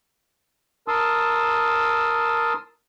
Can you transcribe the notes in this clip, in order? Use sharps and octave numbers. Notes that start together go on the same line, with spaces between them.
A#4 A5 C6 D#6 E6